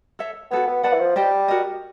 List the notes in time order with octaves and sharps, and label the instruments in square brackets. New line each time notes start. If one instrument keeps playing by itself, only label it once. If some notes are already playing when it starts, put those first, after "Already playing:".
[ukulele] A4 C#5 E5
[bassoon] B3 [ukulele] F#4 A4 C#5
[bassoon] B3
[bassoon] B3 [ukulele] B4 D5 F#5 A5
[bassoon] E3
F3
[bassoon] G3 [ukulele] G4 C5 D#5
[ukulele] F#4 A#4 D#5